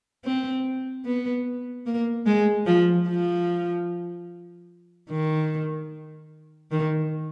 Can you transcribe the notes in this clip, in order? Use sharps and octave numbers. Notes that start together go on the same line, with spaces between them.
C4
B3
A#3
G#3
F3
F3
D#3
D#3